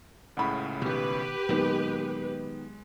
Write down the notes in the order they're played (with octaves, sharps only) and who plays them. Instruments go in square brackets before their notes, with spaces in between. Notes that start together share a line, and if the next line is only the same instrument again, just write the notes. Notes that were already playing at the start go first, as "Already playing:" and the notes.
[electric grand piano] C#2 A2 C#3 [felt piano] F#5 B5
[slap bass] B2 D#3 [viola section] G4 B4
[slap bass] A#2 F#3 [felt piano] D#3 B3 [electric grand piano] G#3